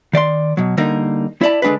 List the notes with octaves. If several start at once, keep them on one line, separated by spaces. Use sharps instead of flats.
D#3 D5 F5 C6
B2 F#3
D3 G3 A#3 D#4 A#4
E4 C#5 D5 A5 B5
D3 G#3 D4 F#4 B4